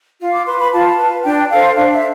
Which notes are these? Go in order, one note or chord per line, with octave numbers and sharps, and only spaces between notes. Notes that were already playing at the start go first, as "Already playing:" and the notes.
F4
D6
B4 C6
B5
F4 A5
B4
D4 G5
A4 C5 F5
D4 F5
E5